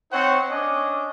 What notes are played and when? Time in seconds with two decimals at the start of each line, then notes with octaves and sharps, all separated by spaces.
0.12 C4 D#4 C5 C#5 F#5
0.50 C#4 D4 D#5 D6